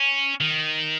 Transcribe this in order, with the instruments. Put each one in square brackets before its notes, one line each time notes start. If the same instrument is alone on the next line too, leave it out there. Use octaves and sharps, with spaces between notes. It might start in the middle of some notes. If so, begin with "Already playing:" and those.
Already playing: [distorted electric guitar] C#4
D#3